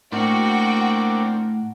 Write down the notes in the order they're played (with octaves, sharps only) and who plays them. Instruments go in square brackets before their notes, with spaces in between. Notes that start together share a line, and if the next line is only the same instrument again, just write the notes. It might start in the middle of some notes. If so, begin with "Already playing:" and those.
[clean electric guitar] A2 [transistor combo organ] A#3 C4 D4 [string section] F#4 G5 [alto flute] F#5